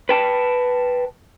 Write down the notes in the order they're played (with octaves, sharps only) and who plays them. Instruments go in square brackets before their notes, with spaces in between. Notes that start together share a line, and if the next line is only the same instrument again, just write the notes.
[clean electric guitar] B4 G5 A5